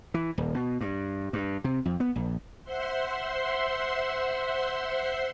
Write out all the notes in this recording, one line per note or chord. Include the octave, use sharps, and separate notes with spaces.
E3
D#1
B2
G2
G2
C3
F2
B3
A#1
C5 E5 F#5 C6